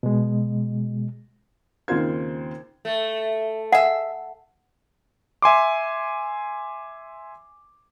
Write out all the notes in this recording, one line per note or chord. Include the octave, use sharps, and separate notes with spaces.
B2 G#3
D#2 C#3 C4 F4 C5 G#6
A3
G#4 E5 F#5
E5 G#5 C6 D6